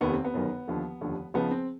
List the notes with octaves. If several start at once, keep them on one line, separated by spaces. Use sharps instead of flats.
F1 D#2 D#3 B3
C4
B3
G1 F#2 D#3
D#2 D3 F3
F1 D#2 D3 F3
C#2 C#3 F3 B3
C4